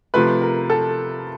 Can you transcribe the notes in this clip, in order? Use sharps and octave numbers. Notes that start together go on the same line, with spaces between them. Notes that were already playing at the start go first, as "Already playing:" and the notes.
C3 F3 A3 B4
A#4
A4